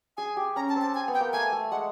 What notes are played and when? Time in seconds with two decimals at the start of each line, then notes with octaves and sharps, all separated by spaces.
0.17 G#4 G#5
0.37 G4
0.56 C#4 A#5
0.69 A5
0.76 C4
0.81 A5
0.95 G#5
1.08 B3
1.14 G5
1.20 A#3
1.33 A3 G#5
1.52 A3
1.71 G#3 F#5